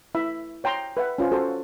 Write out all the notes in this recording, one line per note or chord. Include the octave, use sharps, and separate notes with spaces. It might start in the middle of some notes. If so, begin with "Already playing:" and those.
E4 E5 B5
C#5 G5 A#5 C6
B4 E5 F#5
C#4 F4 C5
F#4 A4 C5